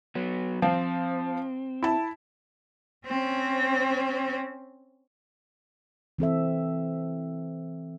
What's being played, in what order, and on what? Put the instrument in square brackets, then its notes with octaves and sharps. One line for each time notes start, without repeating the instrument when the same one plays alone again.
[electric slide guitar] F#3 B3
[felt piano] F3 [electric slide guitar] C4
[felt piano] E4 A5
[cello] C4 C#4
[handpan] E3 C4 A4 E5